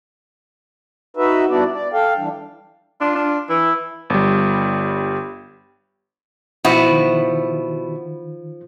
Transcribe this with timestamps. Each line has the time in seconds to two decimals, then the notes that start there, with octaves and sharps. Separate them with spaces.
1.17 D#4 F#4 B4 E5
1.50 G2 B3 D4 E4 F#4 D5
1.72 D5
1.93 A4 F5 G5
2.17 E3 G3 D4
3.01 D4 F4
3.15 D4
3.49 E3 E4
4.10 G1 G3
6.64 B2 F3 E4 F#4
6.90 D#3